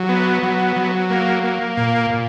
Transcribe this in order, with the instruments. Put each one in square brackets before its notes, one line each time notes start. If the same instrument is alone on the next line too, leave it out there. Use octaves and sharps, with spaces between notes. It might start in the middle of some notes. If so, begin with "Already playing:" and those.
Already playing: [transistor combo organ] F#3
B3
F#3
F#3
A#3
A#3
A#2
A#2